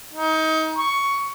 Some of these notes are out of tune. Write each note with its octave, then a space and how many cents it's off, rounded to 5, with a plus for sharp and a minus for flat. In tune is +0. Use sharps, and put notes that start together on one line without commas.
D#4 +30
C#6 +10